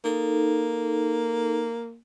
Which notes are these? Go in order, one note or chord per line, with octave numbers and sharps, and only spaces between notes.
A#3 D#4 A4